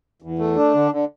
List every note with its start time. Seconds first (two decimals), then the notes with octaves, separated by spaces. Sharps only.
0.22 E2
0.39 A3
0.56 D4
0.74 D3
0.92 D3